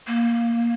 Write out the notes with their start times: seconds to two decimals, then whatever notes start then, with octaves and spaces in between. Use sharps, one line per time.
0.07 A#3